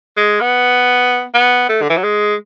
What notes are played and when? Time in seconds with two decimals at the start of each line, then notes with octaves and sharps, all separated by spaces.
0.17 G#3
0.41 B3
1.34 B3
1.69 A3
1.82 D3
1.90 E3
1.97 F#3
2.04 G#3